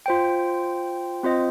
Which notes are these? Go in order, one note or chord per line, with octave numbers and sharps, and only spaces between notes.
F4 C5 G5
C4 F4 C5 D#5